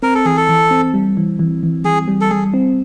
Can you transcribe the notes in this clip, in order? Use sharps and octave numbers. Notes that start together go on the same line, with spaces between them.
C4 A#4
A4
E3 G#4
A4
E3
C4
G3
E3
E3
E3
E3 G#4
G3
A4
G3 G#4
C4